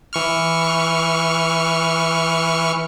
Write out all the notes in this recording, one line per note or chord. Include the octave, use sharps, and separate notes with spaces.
E3 C#6 F6